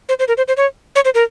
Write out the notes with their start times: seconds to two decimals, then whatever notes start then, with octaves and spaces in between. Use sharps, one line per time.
0.09 C5
0.19 C5
0.28 A#4
0.37 C5
0.48 C5
0.57 C#5
0.95 C#5
1.05 C5
1.15 A#4